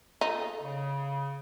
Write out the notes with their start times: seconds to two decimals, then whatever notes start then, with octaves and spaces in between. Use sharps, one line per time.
0.21 D#4 F4 G#4 A4
0.61 C#3